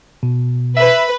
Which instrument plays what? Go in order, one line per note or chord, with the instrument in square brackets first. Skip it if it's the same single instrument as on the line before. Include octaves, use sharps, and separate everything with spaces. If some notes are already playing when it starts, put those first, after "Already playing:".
[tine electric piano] B2
[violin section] B4 [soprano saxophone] E5